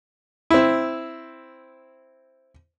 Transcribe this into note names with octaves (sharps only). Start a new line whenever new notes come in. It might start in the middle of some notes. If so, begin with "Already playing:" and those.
C4 E4